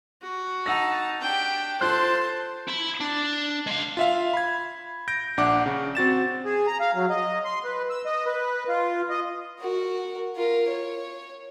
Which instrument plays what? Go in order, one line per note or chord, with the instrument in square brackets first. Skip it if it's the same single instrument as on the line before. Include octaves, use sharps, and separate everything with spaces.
[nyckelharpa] F#4
[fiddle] D#4 A5 [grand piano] F#5 E6 A#6
[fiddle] D4 G4 [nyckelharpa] G5
[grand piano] F4 F#6 [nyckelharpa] A4 [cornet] C5 [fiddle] A5 C6
[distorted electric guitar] E4 B5
D4
G#3 F5
[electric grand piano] F4 E5 F5
B5 G#6
G6 A#6 D7
A#1 D4 F#5 D6
C#3
C4 F#4 A6 E7
[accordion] G#4
A#5
F5
F#3
D#5
C6
B4
E6
D#5
B4
F4
D#5
[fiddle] F#4 A#4
F4 A#4
C#5